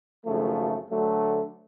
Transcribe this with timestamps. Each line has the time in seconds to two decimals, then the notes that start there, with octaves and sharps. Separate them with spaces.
0.24 G#1 F#2 C#3 F3 A3
0.89 D2 D3 F#3 A3